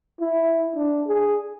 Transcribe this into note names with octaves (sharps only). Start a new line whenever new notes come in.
E4
D4
G#4